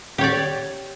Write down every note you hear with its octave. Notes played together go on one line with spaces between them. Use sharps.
G4 C#5 D5